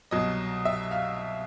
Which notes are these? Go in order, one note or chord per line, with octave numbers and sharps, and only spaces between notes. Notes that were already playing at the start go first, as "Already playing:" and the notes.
C2 B2 F#3 D#5
E5
F5